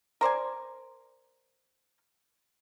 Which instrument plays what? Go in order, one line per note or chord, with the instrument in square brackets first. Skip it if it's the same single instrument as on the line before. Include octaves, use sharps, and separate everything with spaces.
[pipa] A#4 C5 D5 G#5